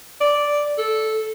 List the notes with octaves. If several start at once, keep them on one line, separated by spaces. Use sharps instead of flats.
D5
A4